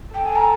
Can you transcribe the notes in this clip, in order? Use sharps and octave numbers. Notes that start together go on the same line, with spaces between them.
A4 G5
G#5
A#5